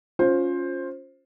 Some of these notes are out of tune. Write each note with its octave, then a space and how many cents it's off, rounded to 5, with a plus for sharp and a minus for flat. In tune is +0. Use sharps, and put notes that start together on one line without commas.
C#4 +10 F4 +15 C5 +15